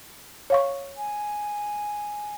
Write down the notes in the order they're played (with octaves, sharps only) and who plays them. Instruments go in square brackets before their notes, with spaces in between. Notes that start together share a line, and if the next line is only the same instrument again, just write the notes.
[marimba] C#5 F5 C#6
[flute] G#5